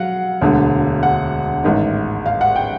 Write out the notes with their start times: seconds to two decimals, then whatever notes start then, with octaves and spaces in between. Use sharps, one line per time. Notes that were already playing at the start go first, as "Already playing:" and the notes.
Already playing: F#3 F5 F#5
0.41 E1 D2 D3
1.03 F#5
1.64 A1 G#2 D#3
2.26 F5
2.41 F#5
2.56 G5